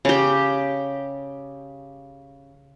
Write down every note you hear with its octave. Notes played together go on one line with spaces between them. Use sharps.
C#3 G4